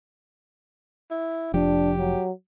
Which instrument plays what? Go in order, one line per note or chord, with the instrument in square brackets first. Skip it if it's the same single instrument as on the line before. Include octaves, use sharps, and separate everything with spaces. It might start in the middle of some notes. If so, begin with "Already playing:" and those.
[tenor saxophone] E4
[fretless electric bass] F1 F3 [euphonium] D4 [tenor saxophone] G4
[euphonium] F#3